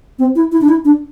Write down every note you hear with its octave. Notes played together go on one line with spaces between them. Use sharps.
C4
E4
E4
D4
E4
D4